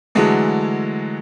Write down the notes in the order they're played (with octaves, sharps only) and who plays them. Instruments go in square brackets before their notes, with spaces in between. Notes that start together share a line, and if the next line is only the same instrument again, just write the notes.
[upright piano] D3 E3 F#3 G#3 A3